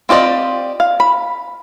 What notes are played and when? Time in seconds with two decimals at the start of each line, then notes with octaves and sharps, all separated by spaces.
0.09 C4 F4 G4 D5 D#5
0.80 F5
1.00 B5